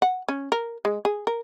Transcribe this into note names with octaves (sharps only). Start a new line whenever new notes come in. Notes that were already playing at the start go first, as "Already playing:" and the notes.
F#5
C#4
A#4
G#3
G#4
A#4